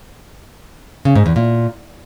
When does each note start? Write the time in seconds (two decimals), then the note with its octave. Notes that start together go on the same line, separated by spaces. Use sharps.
1.05 C#3
1.15 G#2
1.26 E2
1.36 A#2